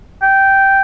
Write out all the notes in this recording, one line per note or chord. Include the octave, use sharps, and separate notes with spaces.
G5